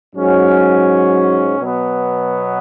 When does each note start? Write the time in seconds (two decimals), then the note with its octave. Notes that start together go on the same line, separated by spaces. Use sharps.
0.15 G#2 F#3 C#4
1.60 B2 F#3 B3